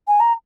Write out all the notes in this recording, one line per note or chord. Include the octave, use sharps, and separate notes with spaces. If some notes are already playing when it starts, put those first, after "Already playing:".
G#5
A#5